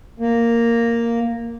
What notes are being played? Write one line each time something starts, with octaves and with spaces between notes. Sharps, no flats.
A#3